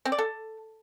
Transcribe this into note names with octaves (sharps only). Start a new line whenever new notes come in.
C4
D5
A4